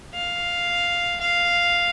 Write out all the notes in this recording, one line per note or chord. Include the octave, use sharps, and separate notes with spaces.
F5
F5